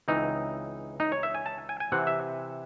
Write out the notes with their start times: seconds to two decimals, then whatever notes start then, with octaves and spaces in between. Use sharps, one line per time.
0.08 C#2 C#3 E3 C4 D#4
1.00 D#4
1.12 C#5
1.23 E5
1.35 G#5
1.46 A5
1.69 G#5
1.80 G#5
1.92 C3 E3 C4 F#5
2.07 E5